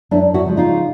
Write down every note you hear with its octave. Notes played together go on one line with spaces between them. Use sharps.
F#2 D4 E4
E4 F#4
C#3 F3 G#3
D#4 F4